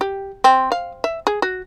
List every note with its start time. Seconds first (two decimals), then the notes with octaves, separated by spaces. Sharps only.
0.01 G4
0.44 C4
0.72 F5
1.04 E5
1.27 G#4
1.42 F#4